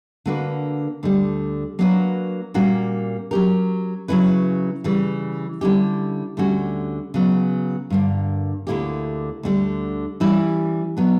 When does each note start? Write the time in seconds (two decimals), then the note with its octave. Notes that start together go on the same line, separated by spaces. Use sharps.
0.26 D3 A#3 D4 F#4 B4
1.03 D2 D3 G3
1.79 F#3 A#3 D4 F#4 B4
2.54 A#2 G3 A#3 C#4 F#4
3.31 F#3 C#4 G4 A#4
4.08 C#3 F#3 C#4 E4 B4
4.84 C#3 E3 G3
5.61 D3 G3 C#4 E4 G4
6.37 D2 D3 G3 C#4 F#4
7.14 C#3 F#3 B3
7.90 G2 D3 A#3
8.67 D2 D3 A#3 E4 G4
9.43 D2 D3 G3
10.20 E3 G3 C#4 E4 G4
10.97 F#3 B3 D4